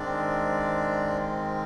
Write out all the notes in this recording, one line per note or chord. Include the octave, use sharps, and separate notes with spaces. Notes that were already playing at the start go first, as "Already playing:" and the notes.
Already playing: G#2 D#3 G#3 C4 D4 D5